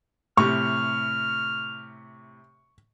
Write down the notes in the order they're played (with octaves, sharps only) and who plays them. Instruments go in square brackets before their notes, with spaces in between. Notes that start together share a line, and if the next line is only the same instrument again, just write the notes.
[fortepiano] A2 C3 [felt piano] C#6 [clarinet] F6